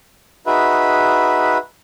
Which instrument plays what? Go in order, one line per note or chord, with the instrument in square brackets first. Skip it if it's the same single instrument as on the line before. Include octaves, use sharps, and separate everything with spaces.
[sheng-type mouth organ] D#4 F#4 G#4 B4 E5 B5